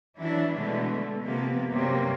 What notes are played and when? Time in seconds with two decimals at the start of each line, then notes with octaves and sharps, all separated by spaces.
0.19 E3 F#3 D4 E4
0.54 B2 D3 E3 G#3 A3 B3
1.25 C3 F3 A#3 B3
1.69 G2 C3 F#3 A#3 C#4